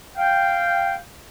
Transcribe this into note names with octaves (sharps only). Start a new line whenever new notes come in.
F5 G5